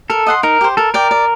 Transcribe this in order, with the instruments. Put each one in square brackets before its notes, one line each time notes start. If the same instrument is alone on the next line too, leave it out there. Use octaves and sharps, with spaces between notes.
[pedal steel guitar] A4 [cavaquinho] A#4
[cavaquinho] D#5 F#5 C6
[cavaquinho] D#4 [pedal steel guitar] A#4
[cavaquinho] G4 C5
[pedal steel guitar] A4 [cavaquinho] A#4
[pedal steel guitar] A#4 [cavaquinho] D5 G5
[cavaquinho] D5